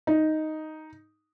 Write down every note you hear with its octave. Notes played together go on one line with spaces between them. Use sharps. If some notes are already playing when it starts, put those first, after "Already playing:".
D#4